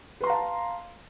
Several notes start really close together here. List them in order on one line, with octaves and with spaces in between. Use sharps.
B4 C6 A#5 F5 A5